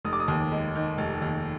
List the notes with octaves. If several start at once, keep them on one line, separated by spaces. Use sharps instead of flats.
F1 D#6
D6
D#6
D#2
G#3
D#3
F1
D#2